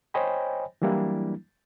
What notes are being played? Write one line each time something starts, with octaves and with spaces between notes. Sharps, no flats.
C5 C#5 D#5 G5 G#5 B5
E3 F#3 G3 A#3 D4 E4